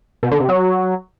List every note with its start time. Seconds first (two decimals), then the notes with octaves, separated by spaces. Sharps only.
0.23 B2
0.31 D3
0.40 C3
0.49 F#3